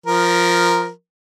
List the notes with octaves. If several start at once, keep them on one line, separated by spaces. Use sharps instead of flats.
F3 A#4